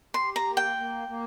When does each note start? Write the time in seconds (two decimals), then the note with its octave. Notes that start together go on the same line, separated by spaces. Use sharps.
0.14 G4 C6
0.36 A#5
0.46 A#3
0.57 G5
0.77 A#3
1.08 A#3